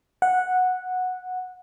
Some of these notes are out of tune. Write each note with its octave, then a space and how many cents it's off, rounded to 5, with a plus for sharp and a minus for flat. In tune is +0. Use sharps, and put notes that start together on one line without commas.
F#5 -10